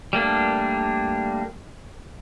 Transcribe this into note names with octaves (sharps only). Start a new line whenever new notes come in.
G3 A3 A#3 D4